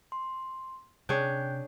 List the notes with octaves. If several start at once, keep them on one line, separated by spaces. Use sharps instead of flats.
C6
C3 C#4 D4 G#4 C#5 G5 F#6 G6